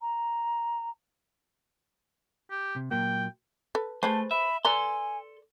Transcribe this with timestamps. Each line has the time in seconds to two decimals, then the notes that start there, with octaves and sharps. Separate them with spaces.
0.01 A#5
2.51 G4
2.76 C3
2.91 A#2 F#3 A#3 G5
3.75 A4 B4
4.03 A3 G#4 B4 C5 A5
4.31 E5 B5
4.65 A4 B4 D5 G#5 A#5 C6